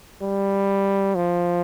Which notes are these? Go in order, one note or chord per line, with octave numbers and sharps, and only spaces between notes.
G3
F3